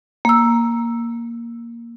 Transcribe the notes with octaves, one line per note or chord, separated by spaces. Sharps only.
A#3 E6